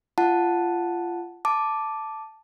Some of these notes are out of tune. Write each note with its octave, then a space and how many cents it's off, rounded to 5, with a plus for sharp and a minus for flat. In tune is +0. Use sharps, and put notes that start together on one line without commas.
F4 -20 F#5 -5 A5 +0
A5 +0 D6 +0